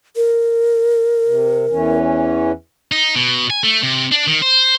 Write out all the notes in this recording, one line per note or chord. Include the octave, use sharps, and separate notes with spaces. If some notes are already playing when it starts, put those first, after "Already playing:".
A#4
C3
E2 E3 C#4
D#4
B2
G#5
A3
C3
D4
D#3
C5